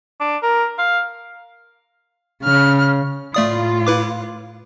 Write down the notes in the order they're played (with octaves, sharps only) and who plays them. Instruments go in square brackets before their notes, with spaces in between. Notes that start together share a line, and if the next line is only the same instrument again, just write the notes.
[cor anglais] D4
A#4
F5
[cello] C#3 [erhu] F6
[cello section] A2 F4 [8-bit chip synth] A3 D5 D#6
[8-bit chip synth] E4 B4 D6